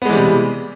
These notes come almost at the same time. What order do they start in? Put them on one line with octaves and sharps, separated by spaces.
B3 G#3 E3 G3 C3